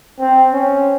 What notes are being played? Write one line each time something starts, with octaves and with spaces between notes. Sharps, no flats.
C4
C#4